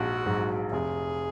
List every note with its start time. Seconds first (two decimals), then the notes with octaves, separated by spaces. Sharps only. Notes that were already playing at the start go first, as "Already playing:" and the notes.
Already playing: A#1 G#2 F#4
0.26 G#2 F#3
0.72 F1 G#4